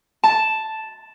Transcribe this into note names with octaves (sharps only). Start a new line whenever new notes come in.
A5